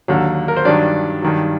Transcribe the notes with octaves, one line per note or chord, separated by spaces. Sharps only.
D#2 D3 F#3
A#4
C5
G2 D#3 F#3 D4 D5
G2 D#3 F#3